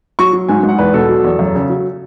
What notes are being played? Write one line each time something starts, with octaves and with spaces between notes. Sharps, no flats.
F#3 C#6
F#3
G#2 G#5
G#2
F#5
E2 B4
B2 A4
F#3
E2
F#2
C#3
F#3